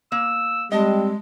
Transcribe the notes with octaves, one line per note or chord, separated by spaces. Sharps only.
A#3 E6
G3 G#3 C4 D#5 A5